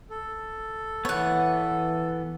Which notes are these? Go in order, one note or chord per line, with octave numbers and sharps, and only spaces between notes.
A4
E3 B3 C#5 F#5